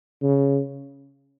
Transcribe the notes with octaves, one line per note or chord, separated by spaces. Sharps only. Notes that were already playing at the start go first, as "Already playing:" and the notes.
C#3